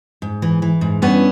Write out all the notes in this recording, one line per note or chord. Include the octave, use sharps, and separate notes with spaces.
G#2
E3
E3
G#2
G2 B3 C#4